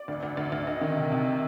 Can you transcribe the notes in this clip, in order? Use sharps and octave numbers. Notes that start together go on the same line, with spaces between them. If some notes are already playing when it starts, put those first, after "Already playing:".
Already playing: D5
D2
D2
D2
D2
D2 D#5
D#3
C3
C3